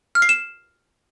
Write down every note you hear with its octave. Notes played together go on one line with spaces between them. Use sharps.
F6
C7
E7